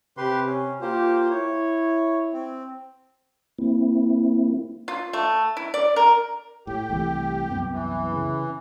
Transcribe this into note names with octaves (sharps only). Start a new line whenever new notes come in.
C3 G4 B4 C6
C#4
A#3 F4 G4 C5
E4 C#5
C4
A#3 C4 E4
F4
A3
E4
D5
A#4
A2 G4
C2 E3 A3
C2 F#2 B3
E3
C#3